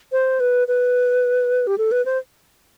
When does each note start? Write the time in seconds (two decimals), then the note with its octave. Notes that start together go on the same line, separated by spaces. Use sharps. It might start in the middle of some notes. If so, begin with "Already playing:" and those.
0.12 C5
0.40 B4
0.68 B4
1.67 G4
1.78 A4
1.92 B4
2.05 C5